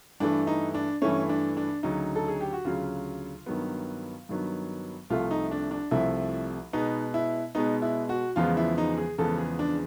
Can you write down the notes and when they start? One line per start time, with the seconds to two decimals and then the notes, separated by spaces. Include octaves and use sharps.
0.20 G2 E3 A3 D4
0.47 D#4
0.74 D4
1.02 G2 E3 A3 C#4
1.29 D4
1.57 D4
1.83 D2 C#3 F#3 D#4
2.16 A4
2.28 G#4
2.41 G4
2.53 F#4
2.65 D2 C#3 F#3 F4
3.46 G2 D#3 F#3 B3
4.29 G2 D#3 F#3 B3
5.10 C2 C3 F3 A3 F4
5.31 D#4
5.51 D4
5.71 D4
5.91 C2 C3 F3 A3 E4
6.73 B2 G#3 B3 D#4
7.14 E4
7.55 B2 G#3 B3 D#4
7.82 E4
8.09 F#4
8.36 E2 C#3 F3 G#3 B3 F4
8.57 E4
8.78 D#4
8.98 G#4
9.18 E2 C#3 F3 G#3 B3 A4
9.38 G#4
9.59 D4